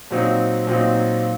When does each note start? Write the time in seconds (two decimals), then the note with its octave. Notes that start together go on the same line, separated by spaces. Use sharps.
0.11 A#2 F#3 C4 D#4
0.67 A#2 F#3 C4 D#4